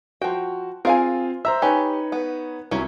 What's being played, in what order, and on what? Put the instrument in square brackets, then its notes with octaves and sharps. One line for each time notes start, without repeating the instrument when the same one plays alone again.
[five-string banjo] F3 G5 [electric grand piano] F#4
[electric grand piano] C4 F4 G#4 [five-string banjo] A#4 F5 G#5
[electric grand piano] C5 A#5 E6 [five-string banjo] E5
[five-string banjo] C#4 G4 [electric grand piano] D#4 B4 C#5
[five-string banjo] B3
[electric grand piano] C2 [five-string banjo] F#3 C#4 E4